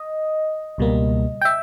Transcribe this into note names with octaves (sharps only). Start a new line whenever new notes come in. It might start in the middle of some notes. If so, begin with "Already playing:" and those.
Already playing: D#5
C#2 B2 G3 A#3
G5
E5